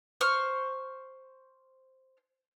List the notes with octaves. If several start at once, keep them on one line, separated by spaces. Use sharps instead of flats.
C5 C#6 F6